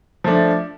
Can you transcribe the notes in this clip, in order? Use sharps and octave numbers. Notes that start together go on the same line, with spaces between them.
F3 A3 D4